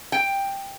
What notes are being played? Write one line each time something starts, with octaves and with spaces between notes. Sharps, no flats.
G5